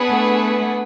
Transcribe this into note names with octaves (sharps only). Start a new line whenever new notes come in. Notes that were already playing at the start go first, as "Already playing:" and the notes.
Already playing: B3 D4 G#4 B4 F#5
A3